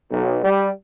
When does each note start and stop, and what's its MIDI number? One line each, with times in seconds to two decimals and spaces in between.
0.11 0.39 35
0.44 0.68 55